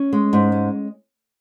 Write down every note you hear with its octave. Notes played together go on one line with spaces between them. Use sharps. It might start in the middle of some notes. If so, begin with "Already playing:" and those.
Already playing: C#4
G#3
G#2
G#3